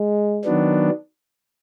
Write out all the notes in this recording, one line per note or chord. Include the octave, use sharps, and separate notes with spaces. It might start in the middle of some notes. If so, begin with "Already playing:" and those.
Already playing: G#3
D#3 F#3 B3 D4